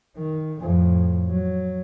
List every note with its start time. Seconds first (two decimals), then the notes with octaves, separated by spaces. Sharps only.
0.17 D#3
0.61 F2 A2
1.29 F#3